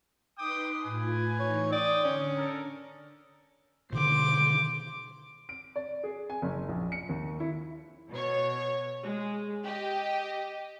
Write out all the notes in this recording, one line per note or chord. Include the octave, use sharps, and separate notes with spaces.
D#4 B4 G5 C6 D6 D#6
A2 F4 B4 G#5
A2 E3 D#4 C#5
D5 G5 C6 D#6
D3 C#4
A4 A#4
B2 D3 D#3 C5 D6
D7
D5
G#4
G#5
F#1
A#1
C#7
D#2
E4
B2 C#5
G#3
G4 D#5